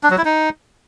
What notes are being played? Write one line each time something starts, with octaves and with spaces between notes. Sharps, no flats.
D4
F#3
E4
D#4